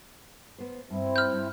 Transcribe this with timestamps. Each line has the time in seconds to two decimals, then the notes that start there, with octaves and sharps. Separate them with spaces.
0.58 B3 C5
0.90 G2 C4 E4
1.16 F6 G6
1.33 G2